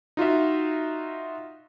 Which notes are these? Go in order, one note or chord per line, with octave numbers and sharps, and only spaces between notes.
D#4 F4 F#4 E5